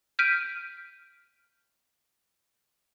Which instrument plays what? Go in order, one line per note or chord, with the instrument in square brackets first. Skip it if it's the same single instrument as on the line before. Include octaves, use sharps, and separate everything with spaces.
[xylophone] F6 G6 B6 D7 D#7